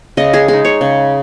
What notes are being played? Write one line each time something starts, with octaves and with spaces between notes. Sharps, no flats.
C#3 D#5
G#4
G#3 D#4 G#4
C#5
C#3